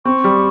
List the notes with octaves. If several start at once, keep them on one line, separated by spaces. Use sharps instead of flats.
C4 C#6
G3